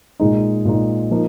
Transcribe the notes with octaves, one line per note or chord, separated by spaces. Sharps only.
A#2 G#3 D#4
A#2 G#3 D#4
F3 A#3 D#4